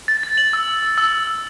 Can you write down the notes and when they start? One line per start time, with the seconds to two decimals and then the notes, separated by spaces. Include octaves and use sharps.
0.08 A6
0.23 A6
0.38 F#7
0.53 E6
0.68 E6
0.83 E6
0.98 E6
1.13 E6
1.27 E6